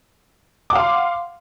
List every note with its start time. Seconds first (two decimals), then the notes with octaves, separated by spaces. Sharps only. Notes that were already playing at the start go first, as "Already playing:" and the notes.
0.70 D6
0.73 F#5
0.75 F5
0.78 C6